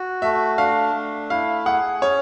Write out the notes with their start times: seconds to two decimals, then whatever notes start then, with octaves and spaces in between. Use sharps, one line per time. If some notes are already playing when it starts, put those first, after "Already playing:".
Already playing: F#4
0.22 A3 E5
0.57 D4 F5
0.94 A3
1.30 E4 F5
1.66 G#4 F#5
2.02 C#4 C#5